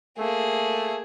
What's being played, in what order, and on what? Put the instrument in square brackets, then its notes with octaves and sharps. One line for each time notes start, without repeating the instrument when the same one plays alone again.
[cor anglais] A3 [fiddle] A#3 G#4